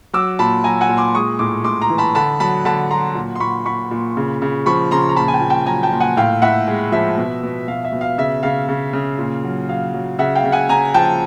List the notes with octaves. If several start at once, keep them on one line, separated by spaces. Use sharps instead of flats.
F#3 D6 E6
A#2 A5 B5
F#3 G#5 A#5
F#5 G#5
A#2
C6 D6
G#3 C#6 D#6
A2 C6 D6
A2 C6 D6
A#5 C6
E3
A5 B5
D3 A5 B5
F#3 A5 B5
D3 A5 B5
F#3 A#5 C6
A#2
C6
A#2 B5 C#6
A#2 B5 C#6
A#2
C#3
C#3
F3 B5 C#6
C#3 A#5 C6
A#5
A#2 A5 B5
G#5
G5 A5
A#2
G5 A5
F#3 G#5 A#5
G5 A5
A#2
F#5 G#5
A2 F5 G5
A2 E5 F#5
G#3
F3 E5
B2
B2
B2 F5
E5
B2
F5
C#3 E5
C#3 F5
C#3
C#3
A#2
F#3
F#3 F5
F#3
C#3 E5 F#5
F5 G5
C#3
F#5 G#5
C#3 G#5 A#5
F3 G5 A5